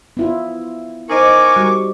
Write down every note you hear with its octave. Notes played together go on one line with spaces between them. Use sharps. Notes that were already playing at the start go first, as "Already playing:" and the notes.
B3 E4 F4
D#4 A#4 C5 D#5 G#5 C#6 D6
G3 F#4